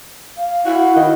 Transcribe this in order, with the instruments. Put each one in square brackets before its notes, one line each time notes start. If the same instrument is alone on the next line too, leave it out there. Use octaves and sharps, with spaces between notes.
[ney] F5
[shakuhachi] E4 [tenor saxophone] F#4
[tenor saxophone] D#3